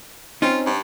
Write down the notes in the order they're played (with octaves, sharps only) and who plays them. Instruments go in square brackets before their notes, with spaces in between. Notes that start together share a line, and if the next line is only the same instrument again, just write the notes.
[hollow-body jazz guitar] C4 C#4 D#4 [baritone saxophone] F4
[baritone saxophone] G2